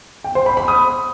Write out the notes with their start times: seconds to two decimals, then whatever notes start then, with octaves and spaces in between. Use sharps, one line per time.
0.24 G5
0.35 C5
0.46 B5
0.57 B5
0.68 D#6